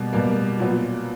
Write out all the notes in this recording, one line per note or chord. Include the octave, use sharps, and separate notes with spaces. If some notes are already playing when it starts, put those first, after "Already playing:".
Already playing: B2 G3 A#3
B2 G3 A#3
A#2 F#3 B3